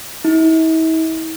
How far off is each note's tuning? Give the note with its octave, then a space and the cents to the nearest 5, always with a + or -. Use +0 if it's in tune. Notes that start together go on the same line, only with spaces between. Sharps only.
E4 -45